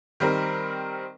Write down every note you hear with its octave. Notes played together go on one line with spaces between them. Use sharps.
D#3 G3 C4 A#4